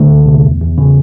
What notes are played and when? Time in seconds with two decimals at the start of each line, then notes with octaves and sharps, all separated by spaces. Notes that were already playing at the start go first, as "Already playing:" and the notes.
Already playing: D3 A3
0.10 C#2
0.26 C3
0.44 E2
0.61 E2
0.78 C#3